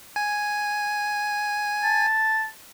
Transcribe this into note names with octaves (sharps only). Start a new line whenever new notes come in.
G#5
A5